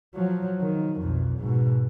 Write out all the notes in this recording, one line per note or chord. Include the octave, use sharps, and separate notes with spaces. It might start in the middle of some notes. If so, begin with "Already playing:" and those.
F3 F#3
D#3
B1 F2
G#2 B2